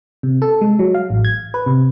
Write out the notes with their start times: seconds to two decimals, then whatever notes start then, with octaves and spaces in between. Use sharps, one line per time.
0.23 C3
0.42 A4
0.61 G#3
0.79 F#3
0.94 F5
1.10 A1
1.25 G#6
1.54 B4
1.66 C3